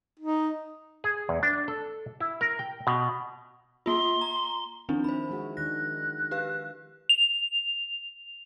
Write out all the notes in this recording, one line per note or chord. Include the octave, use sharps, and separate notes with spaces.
D#4
G#4
E2
D4
A4
E4
A#4
G5
B2
A#3 F4 C6
A#5
D#3 F3 C4 D4 E4
E4 C5 B5
G#3 F#4 G#4
D#3 D4 F#6 A#6
G4 B4 F5
F7